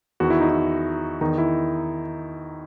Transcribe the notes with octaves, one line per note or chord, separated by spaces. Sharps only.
E2 D#3 F#4
E4
D#4
E4
E2 D#3 D#4
E4